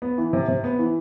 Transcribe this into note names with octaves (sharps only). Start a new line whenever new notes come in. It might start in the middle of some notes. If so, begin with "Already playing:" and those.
B3
E3
C3
C3
B3
E3